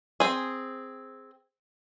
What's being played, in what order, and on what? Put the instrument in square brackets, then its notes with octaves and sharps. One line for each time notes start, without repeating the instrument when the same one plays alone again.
[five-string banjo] C4 G#4